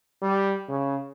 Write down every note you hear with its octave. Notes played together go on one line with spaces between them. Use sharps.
G3
C#3